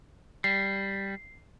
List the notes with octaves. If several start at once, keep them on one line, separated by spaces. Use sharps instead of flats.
G3 C7